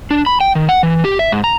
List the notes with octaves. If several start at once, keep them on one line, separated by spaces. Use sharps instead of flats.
D4
B5
G5
D#3
F#5
E3
G4
E5
G#2
A#5